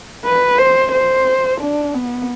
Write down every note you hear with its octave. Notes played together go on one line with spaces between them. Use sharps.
B4
C5
C5
D4
B3